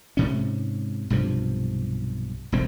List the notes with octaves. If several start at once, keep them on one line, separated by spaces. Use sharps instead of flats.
G#2 C3 C#4
B1 G2 C3 F3
E1 C2 A2 C4